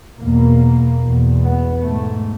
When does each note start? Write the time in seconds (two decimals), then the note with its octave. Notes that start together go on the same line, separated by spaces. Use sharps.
0.18 E2 B2 A#3
1.00 E2 B2
1.40 B3
1.81 G#2 A3